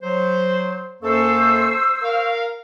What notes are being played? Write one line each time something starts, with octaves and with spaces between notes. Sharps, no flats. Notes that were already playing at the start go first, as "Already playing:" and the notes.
F#3 C5
F#2 A#3 A4 C5 C#6 E6
A#4 F5